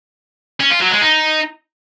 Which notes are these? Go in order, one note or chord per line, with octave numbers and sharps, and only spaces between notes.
C#4
F4
F#3
G#3
D#4